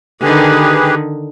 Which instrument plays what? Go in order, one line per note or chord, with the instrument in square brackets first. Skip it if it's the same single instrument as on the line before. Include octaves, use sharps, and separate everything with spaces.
[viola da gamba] D3 D#3 [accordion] G4 G#4 B4